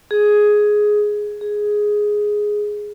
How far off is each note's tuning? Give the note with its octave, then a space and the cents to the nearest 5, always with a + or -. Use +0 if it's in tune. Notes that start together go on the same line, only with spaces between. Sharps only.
G#4 +10
G#4 +5